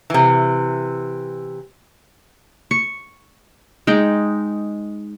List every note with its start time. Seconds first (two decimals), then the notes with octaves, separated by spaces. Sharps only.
0.10 C3 E3
2.71 C#6
3.87 G#3 D#4 G5